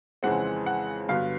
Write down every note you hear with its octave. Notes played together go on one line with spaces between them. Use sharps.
F2 C#3 E3 G#3 C4 F#5
F#5
G2 D3 F#3 B3 F5